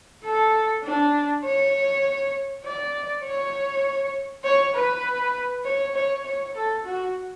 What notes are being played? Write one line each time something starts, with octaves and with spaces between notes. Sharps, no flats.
A4
D4
C#5
D5
C#5
C#5
B4
C#5
C#5
C#5
A4
F#4